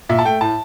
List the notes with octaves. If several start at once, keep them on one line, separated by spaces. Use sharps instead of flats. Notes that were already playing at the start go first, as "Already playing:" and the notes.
A#2 E5
A5
A3 G5
A2 A5